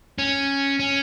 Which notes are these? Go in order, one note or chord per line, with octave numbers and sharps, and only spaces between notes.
C#4
C#4